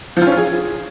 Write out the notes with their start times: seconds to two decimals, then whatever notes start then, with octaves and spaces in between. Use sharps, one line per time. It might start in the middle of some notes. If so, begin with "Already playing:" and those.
0.17 F3
0.22 F4
0.27 C#4
0.32 F4
0.37 G#4